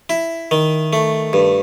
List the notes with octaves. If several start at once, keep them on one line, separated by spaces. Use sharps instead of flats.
E4
D#3
A3
G2